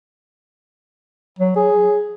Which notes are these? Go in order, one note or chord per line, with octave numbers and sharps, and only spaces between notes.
F#3
G#4